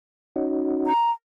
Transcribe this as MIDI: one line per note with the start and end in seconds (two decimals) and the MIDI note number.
0.36 0.93 61
0.36 0.93 63
0.36 0.93 66
0.87 1.11 82